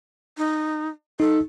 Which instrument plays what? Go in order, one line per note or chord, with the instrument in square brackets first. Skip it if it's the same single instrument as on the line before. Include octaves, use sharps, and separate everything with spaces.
[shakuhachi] D#4
[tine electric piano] D#4 [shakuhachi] A4